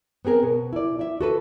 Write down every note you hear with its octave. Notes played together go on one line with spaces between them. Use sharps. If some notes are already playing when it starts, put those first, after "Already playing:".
B3 C4 G#4 A#4
B2
E4 D5
E4 E5
F#4 A4 B4